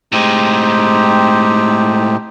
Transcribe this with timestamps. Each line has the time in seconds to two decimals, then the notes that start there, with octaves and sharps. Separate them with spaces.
0.12 A2 G#3 C4 D#4 G4